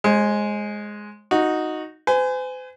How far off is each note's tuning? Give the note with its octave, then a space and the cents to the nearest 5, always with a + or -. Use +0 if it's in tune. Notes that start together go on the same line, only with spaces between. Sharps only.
G#3 +5 C5 +45
D#4 +0 F#4 -10
C5 -45 G#5 +0